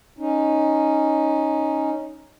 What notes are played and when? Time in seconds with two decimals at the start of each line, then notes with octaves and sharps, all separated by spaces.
0.19 C#4 D#4